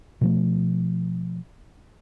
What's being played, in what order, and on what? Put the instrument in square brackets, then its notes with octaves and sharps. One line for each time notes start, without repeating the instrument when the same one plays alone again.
[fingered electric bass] B2 F3 A3